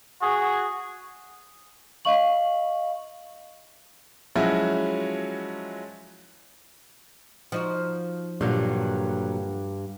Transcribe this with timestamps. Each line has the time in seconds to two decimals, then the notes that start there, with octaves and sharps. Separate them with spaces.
0.22 F#4 G#4
2.05 D#5 F5 C#6 F#7
4.35 F3 F#3 G#3 C#4 E4 F#4
7.52 F3 D#4 F#4
8.41 G2 A#2 D3 F#3